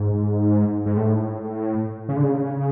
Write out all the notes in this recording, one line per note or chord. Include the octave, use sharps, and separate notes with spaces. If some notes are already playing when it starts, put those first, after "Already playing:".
Already playing: G#2
G#2
A2
C#3
D3
C#3